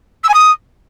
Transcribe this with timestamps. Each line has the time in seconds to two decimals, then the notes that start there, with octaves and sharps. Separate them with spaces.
0.24 E6
0.29 G#5
0.34 D#6